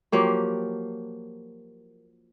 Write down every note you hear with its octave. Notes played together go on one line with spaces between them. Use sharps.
F3 F#3 A#3 G4